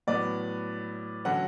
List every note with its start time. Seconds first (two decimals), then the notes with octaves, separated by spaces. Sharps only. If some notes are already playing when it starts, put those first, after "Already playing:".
0.07 A2 F#3 B3 D5
1.25 D3 F#3 A3 C#4 F#5